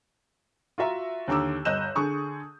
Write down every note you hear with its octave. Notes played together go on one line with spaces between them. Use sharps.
F4 F#4 E5 A#5
D#2 D3 A#5 D6 E6
G1 D#5 F#6 G6 E7
D3 G#4 G#5 C#6 D#6